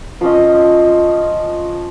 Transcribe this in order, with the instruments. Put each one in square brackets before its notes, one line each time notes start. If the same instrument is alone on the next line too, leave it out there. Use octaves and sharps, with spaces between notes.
[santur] F3 C#4 D#5